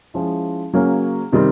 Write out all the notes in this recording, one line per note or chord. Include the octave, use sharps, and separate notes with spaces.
F3 G#3 C#4 E4
C#3 F#3 A#3 C#4
C3 D#3 G3 C4